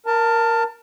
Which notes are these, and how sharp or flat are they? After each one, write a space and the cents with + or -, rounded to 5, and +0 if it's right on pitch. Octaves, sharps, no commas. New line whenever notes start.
A#4 +0 A5 +25